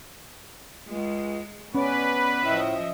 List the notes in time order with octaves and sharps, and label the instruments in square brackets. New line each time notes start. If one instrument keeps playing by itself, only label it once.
[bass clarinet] C#2 [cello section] G#3
[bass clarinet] B3 [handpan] C#4 [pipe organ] B4 [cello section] D5
[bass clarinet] A2 [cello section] F3 D#5 E5